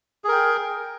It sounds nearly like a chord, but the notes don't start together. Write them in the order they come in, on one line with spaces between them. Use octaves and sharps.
G#4 A#4 G5